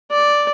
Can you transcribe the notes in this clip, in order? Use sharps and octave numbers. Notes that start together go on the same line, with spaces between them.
D5